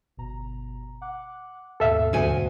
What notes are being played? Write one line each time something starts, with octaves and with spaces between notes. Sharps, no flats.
G1 B2 A#5
F#5 D6 F#6
D#2 G#2 B2 A4 E5 F5
D2 G#5